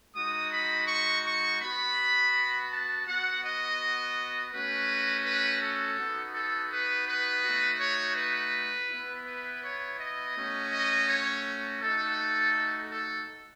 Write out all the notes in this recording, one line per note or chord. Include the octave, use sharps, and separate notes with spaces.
G#3 D#4 F#4 D#6
B5
C#6
C#6
B3 F#4 B5
A5
B3 F#4 F#5
D#5
A3 C#4 F#4 B4
B4
A4
B3 D#4 F#4
A4
B4
B4
A3 D#4 F#4
C#5
B4
B3 E4
B4
C#5
D#5
A3 C#4 F#4
D#5
C#5
A3 D#4 F#4 A4
A4